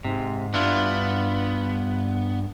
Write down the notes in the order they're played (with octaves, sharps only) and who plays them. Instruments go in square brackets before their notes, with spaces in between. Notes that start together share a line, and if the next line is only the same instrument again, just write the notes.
[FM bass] G#2 [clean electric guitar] C3
[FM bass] G2 [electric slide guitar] B3 [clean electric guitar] D4 E4 F4